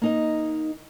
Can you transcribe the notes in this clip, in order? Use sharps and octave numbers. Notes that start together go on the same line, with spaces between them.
A#3 D#4 D#5